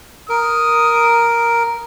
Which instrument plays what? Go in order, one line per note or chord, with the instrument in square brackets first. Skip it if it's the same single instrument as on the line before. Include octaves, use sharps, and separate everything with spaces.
[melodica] A#4 [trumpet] D#6